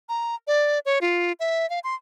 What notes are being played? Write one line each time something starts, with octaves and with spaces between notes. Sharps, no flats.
A#5
D5
C#5
F4
E5
F5
C6